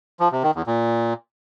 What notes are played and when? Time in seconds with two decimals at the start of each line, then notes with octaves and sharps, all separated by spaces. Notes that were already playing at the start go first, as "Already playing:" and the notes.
0.20 F3
0.32 C3
0.43 D#3
0.55 E2
0.67 A#2